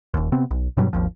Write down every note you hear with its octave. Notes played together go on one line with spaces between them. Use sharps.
D#1 D#2
C3 B3 C4
B1
G2 B2 F#3 G3
G#1 D#2 F3